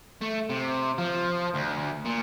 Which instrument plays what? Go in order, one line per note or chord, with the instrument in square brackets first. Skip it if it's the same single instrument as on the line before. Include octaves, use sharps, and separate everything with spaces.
[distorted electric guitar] A3
C3
F3
D2
A#2